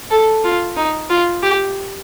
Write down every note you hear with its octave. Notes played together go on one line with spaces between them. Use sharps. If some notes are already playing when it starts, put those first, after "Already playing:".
A4
F4
D#4
F4
G4